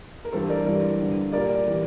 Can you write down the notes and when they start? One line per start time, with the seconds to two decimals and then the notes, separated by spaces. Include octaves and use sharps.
0.25 A#4
0.32 G2 E3 G3 A4 C5
0.49 A#4 D5
0.66 G2 E3 G3
0.99 G2 D3 G3
1.32 A#2 G3 A#4 D5
1.66 E3 G3